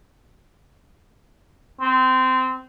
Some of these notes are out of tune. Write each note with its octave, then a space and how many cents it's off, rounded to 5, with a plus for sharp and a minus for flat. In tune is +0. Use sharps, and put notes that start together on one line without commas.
C4 -20